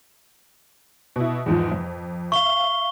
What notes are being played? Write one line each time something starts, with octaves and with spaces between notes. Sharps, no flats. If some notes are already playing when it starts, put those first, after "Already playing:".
B2 E4
E2 G#2 F3
F2
E5 F5 C#6 G7